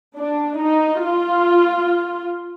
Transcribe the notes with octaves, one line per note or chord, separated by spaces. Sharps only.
D4
D#4
F4